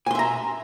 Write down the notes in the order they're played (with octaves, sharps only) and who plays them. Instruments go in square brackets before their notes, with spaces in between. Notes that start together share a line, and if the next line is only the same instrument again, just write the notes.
[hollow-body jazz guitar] G#5
C6
E5
A#5